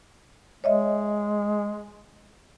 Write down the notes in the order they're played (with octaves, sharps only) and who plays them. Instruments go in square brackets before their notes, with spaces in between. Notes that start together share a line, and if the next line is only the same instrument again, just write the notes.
[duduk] G#3 [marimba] C#5 D#5 E5